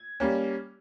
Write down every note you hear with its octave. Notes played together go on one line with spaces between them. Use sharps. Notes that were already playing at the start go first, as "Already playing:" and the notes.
Already playing: G#6
G3 A#3 C#4